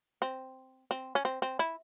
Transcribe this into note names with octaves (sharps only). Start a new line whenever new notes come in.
C4
C4
C#4
C4
C4
E4